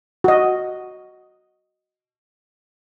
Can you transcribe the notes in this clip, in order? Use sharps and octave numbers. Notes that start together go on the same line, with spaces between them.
F#4 D#5